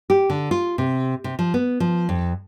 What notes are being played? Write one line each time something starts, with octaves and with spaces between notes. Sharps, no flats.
G4
D3
F4
C3
C3
F3
B3
F3
F2